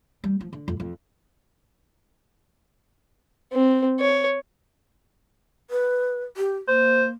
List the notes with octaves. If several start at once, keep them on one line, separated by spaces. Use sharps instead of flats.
G3
F3
D3
F2
F2
C4
C#5
B4
G4
A#3 C5